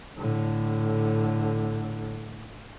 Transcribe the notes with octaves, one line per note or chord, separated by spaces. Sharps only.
A2 D3